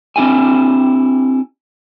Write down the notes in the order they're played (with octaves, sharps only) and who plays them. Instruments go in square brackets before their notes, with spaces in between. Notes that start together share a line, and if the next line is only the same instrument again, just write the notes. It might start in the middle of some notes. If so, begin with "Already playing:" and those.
[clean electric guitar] C4 D4 E4 G4 G#5